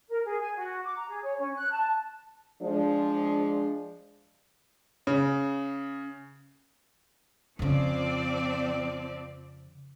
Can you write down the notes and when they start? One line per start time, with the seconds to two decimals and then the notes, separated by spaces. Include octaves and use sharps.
0.09 A#4
0.24 G#4
0.40 G#5
0.57 F#4
0.84 D6
0.96 A#5
1.08 G#4
1.23 C#5
1.38 C#4
1.55 F#6
1.71 A5
2.62 F3 G#3 D4
5.07 C#3
7.59 F2 C#3 F3 C4 D5